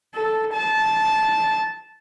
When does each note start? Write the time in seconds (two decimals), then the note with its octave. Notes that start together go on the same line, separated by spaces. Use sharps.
0.14 A4
0.53 A5